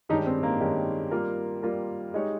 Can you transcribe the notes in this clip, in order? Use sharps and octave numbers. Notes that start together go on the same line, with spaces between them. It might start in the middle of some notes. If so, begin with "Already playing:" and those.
G2 D#3 G#3 C#4 D#4 G4
C4
A#3
G2 D#3 G#3 C#4 G4
G3 A#3 F4 A#4
G3 A#3 F4 A#4
G#3 D#4 G4 C#5